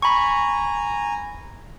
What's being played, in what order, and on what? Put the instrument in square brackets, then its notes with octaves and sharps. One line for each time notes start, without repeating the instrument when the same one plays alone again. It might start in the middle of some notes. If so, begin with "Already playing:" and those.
[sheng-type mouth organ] G#5 A#5 [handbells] B5 C#6